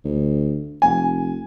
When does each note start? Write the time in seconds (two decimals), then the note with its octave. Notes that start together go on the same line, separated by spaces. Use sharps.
0.05 D2
0.82 F1 G#5